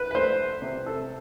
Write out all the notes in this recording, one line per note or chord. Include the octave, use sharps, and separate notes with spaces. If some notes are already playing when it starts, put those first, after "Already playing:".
Already playing: B4
B4
A3 C5
C3
A4